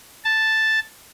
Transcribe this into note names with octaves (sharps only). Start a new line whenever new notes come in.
A5